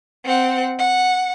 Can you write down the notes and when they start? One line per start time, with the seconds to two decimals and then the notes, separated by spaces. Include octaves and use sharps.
0.24 C4 F#5
0.79 F#5